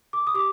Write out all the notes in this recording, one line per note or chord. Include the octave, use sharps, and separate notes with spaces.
D6
D#6
G4 D6